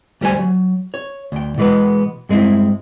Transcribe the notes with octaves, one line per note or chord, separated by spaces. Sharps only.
D2 G3 C5 G#5
F#3
C#5
D2 G5
B2 E3 G#3 B3 B4
G2 G#3 C4 E4